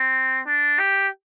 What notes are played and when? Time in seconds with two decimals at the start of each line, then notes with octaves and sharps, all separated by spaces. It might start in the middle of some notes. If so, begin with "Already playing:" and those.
Already playing: C4
0.47 D4
0.79 G4